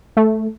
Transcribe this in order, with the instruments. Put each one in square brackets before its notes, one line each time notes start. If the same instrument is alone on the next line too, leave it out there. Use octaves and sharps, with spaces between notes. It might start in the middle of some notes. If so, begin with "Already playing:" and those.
[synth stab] A3